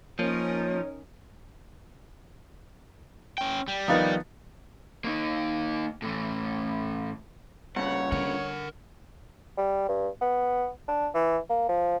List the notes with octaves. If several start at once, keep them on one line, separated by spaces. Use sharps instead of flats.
F3 A#3 C#4 D#4 A#4 C#5
C#4 G5
G3
D#3 F3 B3 D#4 F5 A6
A#3 D#4
A2 E3
G2 A#2 C#3 C#5 F#5
D3 A#4 F#5
G3
G2
B3
D4
E3
A#3
F3